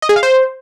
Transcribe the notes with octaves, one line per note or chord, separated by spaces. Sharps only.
D#5
G#4
F5
C5